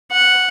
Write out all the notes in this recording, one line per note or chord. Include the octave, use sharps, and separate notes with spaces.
F#5